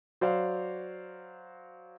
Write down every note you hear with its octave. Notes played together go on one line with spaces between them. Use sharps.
F#3 C5 D5 F5